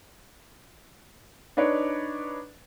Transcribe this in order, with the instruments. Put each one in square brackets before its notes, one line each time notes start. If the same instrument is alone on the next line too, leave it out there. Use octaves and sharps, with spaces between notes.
[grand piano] D4 D#4 B4 C#5 D5